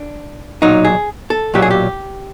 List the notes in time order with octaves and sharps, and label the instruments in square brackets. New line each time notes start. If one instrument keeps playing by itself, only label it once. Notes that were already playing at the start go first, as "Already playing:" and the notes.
Already playing: [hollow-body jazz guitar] D4
B1 A#2 F#3 D#4
G#4
A4
B1 A#2 F#3 G4
G#4
G4